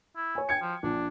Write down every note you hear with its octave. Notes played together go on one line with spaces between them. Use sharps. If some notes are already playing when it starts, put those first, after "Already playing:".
E4
C#5 G#5
G5 G#5 G#6 C#7
F3
A#1 D4